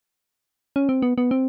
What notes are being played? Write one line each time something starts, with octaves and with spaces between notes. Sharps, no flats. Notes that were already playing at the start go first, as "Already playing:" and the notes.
C#4
C4
B3
B3
C4